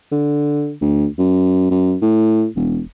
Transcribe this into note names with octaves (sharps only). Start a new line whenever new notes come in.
D3
D2
F#2
F#2
A2
E1